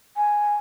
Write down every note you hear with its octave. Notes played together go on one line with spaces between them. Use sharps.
G#5